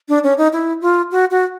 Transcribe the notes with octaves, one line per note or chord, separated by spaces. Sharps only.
D4
C#4
D#4
E4
F4
F#4
F#4